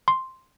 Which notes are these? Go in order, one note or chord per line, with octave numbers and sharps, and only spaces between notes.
C6